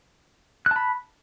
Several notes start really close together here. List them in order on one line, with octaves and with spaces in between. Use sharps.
F#6 A5 B5